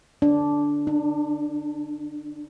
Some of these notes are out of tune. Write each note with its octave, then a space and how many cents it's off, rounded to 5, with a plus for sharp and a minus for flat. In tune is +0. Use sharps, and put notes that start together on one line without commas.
D4 -10
D4 +40